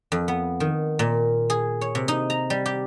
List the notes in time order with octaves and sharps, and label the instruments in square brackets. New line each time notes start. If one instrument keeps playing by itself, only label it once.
[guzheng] F2
B3
D#3
A#2
G#4
C#5
C3
D#4
A#5
G3
G4